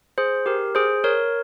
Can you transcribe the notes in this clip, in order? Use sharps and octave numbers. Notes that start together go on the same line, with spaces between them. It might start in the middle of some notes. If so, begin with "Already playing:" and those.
G#4 C5
G4 A#4
G#4 C5
A#4 C#5